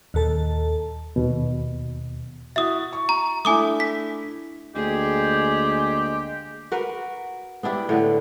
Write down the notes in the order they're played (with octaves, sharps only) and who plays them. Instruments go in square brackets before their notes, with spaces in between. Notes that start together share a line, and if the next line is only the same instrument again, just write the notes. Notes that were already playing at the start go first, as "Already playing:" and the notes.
[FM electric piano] D#2 A#2 A4 A5
[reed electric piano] D#2 B2
[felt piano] E4 F#4 [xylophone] E5 D#6
[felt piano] C#6
[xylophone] A#5
[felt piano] A3 D4 E4 [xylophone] G#5 D6 D#6
[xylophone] B6
[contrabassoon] D2 [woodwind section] G#3 A#3 G4 [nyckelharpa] G#4
[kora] F#4 A#4 B4
B3 D4 E4 G4
A2 D3 B3